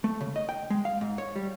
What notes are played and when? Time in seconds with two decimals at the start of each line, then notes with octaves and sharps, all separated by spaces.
0.04 A3
0.21 C#3
0.36 D#5
0.49 G5
0.70 G#3
0.85 F5
1.01 G#2
1.18 C#5
1.36 G3